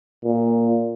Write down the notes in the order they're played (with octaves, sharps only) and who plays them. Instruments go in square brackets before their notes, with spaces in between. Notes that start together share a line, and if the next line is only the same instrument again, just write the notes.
[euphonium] A#2